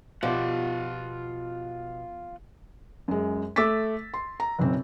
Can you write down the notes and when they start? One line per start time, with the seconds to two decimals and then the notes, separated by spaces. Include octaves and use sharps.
0.23 B2 F3 F4 G4 D5 F#5
3.08 F#2 G#3
3.56 A3 D6 E6 A6 B6
4.14 C6
4.40 A#5
4.59 F#1 B1 C4